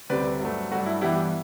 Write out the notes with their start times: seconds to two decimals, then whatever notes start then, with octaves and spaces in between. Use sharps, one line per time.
0.09 D2 C3 G3 C4 B4 D5
0.41 G2 F#3 A3
0.71 G2 F#3 A3 F#4
0.86 E4
1.01 G2 E3 B3 E4 G4